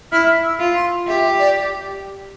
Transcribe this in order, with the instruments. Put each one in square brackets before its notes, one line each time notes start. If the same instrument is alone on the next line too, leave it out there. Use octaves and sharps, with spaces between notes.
[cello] E4 [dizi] F6
[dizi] E6
[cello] F4
[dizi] C6
[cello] G4 [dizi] E5
[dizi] D5